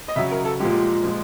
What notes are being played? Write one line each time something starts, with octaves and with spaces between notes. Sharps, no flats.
D#5
C#3 F#3 E5
A#4
A4
A#2 F3 G#3 G4
A#2 F3 G#3